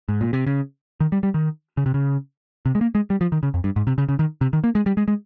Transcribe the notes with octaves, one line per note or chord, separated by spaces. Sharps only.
G#2
A#2
C3
C#3
D#3
G3
G3
D#3
C#3
C3
C#3
C3
G#3
A#3
G#3
G3
F3
D#3
C#3
F2
G2
G#2
C3
C#3
C#3
D#3
C3
D#3
A#3
G#3
G3
G#3
G#3